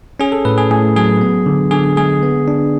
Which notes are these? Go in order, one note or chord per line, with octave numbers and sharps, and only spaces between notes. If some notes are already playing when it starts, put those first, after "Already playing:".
C#4 G#4
A4
A2 B4
G#4
A2 G#4
F#3 G#4
B3
D3
D3 G#4
G#3 G#4
B3
D4